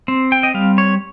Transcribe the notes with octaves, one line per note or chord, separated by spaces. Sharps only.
C4
G5
D#5
G3 F5
C#5